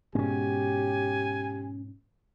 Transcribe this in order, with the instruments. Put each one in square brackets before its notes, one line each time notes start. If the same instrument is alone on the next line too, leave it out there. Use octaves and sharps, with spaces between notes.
[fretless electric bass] G#2 B2 [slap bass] C4 C#4 [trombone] G4 [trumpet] G#5